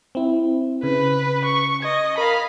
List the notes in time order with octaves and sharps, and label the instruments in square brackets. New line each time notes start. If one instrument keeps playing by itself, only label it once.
[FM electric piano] C4 E4
[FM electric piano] C#3 [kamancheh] B4
[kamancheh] C#6
[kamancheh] D#5 [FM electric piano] G#6
[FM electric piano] A#4 [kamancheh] F5 B5